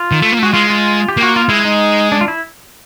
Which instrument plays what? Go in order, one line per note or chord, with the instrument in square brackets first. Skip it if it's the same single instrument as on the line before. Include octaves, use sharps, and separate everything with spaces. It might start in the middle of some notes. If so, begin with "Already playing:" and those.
Already playing: [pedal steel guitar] F4
[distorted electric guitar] D#3
A3
A#3
A3
[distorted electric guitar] G#3 [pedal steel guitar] F#4
[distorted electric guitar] G#3 [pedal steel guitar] F4
[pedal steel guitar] F4
G4
[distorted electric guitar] A#3
[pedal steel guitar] F#4
F4
[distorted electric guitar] G#3 [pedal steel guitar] E4
[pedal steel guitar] D#4
D4
F4
E4